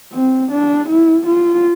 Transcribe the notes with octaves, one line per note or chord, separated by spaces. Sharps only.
C4
D4
E4
F4